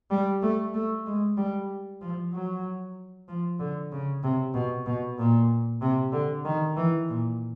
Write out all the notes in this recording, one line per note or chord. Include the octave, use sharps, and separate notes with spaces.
G3
A3
A3
G#3
G3
F3
F#3
F3
D3
C#3
C3
B2
B2
A#2
C3
D3
D#3
E3
A#2